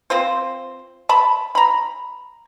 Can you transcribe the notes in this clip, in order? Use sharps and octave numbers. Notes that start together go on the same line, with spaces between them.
C4 F4 C5
A5 B5
A#5 B5